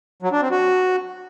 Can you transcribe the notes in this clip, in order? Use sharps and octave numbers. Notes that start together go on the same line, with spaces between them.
F#3
D4
C4
F#4